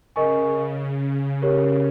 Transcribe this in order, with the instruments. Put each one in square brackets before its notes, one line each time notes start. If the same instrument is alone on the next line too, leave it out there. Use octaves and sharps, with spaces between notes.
[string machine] C#3 [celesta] A#4 D#5 G#5 C#6
[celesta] G4 A#4 C#5